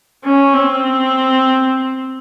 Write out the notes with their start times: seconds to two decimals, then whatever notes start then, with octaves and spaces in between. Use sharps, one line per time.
0.24 C#4
0.54 C4